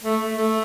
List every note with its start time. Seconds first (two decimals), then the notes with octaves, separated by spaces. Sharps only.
0.03 A3
0.37 A3